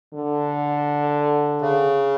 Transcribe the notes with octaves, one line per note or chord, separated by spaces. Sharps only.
D3
C#3